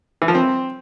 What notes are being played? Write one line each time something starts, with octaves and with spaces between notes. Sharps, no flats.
E3
F3
C4